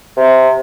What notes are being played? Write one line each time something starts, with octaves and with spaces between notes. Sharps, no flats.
C3